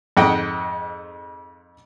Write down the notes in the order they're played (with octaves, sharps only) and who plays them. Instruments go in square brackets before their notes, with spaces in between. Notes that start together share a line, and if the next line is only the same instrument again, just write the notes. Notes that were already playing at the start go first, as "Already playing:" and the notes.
[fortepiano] F2 G#2 D#5 F#5 G5